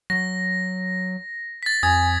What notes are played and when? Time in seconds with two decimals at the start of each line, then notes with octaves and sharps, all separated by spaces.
0.10 F#3 A#6
1.63 A6 B6
1.83 F2 G#5 D#6 G#6